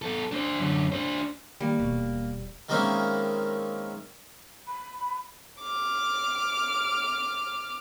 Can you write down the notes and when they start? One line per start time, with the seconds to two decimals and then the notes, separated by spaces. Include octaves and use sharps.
0.02 B3 A4
0.32 D4 C5
0.59 F#2 D3
0.92 D4 C5
1.61 D#3 G3 A#3
1.80 D#1 B2
2.69 D#3 G#3 A#3 C4 C#4 E4
4.67 B5
5.62 D6 F6